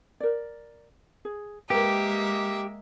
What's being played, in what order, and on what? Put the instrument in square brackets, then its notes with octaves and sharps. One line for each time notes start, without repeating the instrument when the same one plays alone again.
[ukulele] A#4 D5
G#4
[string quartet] G#3 A#3 E5 [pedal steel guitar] G4 [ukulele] A#4 B4